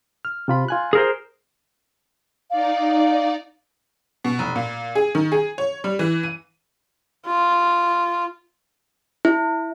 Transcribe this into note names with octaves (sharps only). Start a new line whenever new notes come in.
F6
C3 F4 B5
F4 G#5 F#6
G#4 A#4 C5
D#4 D5 F5
B2
F1
A#2
G#4
D#3
G#4
C#5
G3
E3
D#7
F4
E4